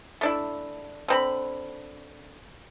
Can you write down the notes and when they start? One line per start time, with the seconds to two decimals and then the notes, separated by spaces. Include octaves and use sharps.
0.21 A3 D4 E4
1.08 D3 C4 B5